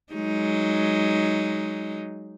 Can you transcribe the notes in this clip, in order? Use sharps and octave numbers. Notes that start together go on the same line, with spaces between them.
F#3 G#3 D#4